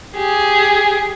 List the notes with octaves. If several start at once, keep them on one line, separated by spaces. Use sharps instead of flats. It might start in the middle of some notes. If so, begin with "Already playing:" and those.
G4 G#4